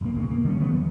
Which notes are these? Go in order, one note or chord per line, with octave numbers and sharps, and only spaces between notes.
F1 A#1 A#3
G#1 D2 A#2 C#3
A#3
D3 G3 C#4
D#3 F#3 A3 B3
E2